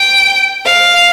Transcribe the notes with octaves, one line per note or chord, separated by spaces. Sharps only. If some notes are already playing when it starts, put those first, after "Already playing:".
Already playing: G5
F5